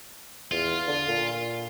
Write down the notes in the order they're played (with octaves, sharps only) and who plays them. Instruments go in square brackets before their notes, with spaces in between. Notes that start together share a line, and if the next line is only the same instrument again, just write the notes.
[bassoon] E2 [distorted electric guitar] F4
[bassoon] D3
A#2